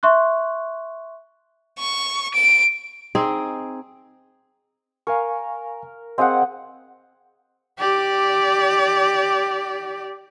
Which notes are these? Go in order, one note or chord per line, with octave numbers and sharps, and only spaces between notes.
E5 C6 C#6 F#6
C#6
D7
C4 D#4 G#4
A#4 F5 G#5 C#6
C4 G#4 D#5 F5 F#5 G#5
G4 D5